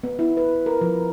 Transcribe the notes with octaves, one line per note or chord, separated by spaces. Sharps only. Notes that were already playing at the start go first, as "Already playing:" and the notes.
B3
E4
B4
A#4
F3